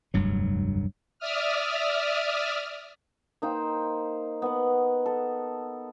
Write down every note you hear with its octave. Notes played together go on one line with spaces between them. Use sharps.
F1 D2 G2 F#3
D5 E5 D#6 F6
A#3 D#4 C5 G5
B3 F#5
A4